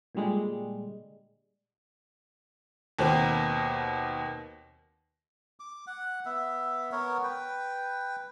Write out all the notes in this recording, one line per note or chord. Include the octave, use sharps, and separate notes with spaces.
A#2 D3 G3 G#3
D#2 B2 A#3 C4
D6
F#5
B3 E5
B3 A#4 C#5
B4 G5